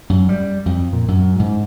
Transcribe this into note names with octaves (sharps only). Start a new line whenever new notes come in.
F#2
G3
F2
A#2
F#2
G#2